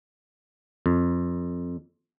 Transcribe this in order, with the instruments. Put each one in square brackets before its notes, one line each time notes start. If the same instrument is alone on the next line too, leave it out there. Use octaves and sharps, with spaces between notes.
[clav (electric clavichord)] F2